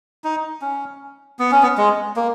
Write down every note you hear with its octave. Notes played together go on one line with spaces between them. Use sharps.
D#4
C#4
B3
C#4
B3
G#3
A#3